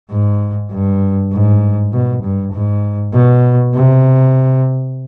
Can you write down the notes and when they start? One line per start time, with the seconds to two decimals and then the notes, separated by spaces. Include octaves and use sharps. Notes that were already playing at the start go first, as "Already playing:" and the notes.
0.11 G#2
0.71 G2
1.32 G#2
1.93 B2
2.23 G2
2.53 G#2
3.14 B2
3.74 C3